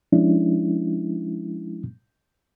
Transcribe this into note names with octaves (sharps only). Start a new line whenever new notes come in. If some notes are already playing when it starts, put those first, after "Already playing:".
F3 G#3 C#4 D4 E4